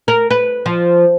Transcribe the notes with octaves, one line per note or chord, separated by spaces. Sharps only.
A#4
B4
F3